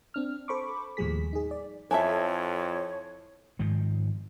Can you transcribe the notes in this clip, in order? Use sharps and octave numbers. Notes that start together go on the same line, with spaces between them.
C4 D4 F6
A4 C5 B5 C#6 D6
D#2 A2 F3 G3 G#4 B6
D#4 G#4
D5
F2 E4 A4 C#5 E5 G#5 A5
G#2 D#3 F3